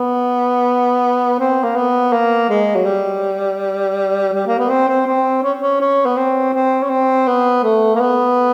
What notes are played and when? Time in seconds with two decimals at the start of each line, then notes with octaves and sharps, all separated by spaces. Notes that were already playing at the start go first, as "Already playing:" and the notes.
Already playing: B3
1.39 C4
1.63 A#3
1.76 B3
2.12 A#3
2.49 G#3
2.75 F#3
2.85 G3
4.33 G3
4.47 A#3
4.59 B3
4.69 C4
4.88 C4
5.07 C4
5.43 C#4
5.61 C#4
5.80 C#4
6.05 B3
6.17 C4
6.53 C4
6.82 C#4
6.89 C4
7.27 B3
7.63 A3
7.95 A#3
8.00 B3